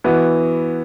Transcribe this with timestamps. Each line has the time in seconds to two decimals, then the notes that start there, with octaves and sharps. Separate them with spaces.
0.04 E3 B3 F#4